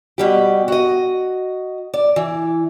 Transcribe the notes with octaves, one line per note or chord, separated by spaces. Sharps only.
B2 G3 G4
F#4 D#5
D5
E3